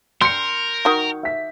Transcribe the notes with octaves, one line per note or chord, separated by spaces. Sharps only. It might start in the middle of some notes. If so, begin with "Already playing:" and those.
A#4 C6 G6 C#7
D#3 F#4
E5 B6